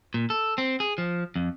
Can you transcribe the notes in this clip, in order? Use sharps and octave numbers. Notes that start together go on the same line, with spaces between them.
A#2
A4
C4
G#4
F3
F2